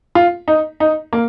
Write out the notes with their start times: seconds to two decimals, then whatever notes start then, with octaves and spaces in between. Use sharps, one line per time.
0.15 F4
0.48 D#4
0.80 D#4
1.13 A#3